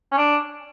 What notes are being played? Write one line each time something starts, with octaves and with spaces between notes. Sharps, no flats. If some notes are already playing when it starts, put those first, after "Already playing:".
C#4
D4